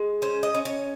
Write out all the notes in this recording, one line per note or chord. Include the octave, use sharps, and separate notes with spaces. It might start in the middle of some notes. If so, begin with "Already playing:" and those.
Already playing: G#3
C#4 C5
D#5
C#4
C#5